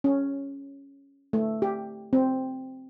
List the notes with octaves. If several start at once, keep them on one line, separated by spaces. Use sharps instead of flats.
C#4
A3
G4
C4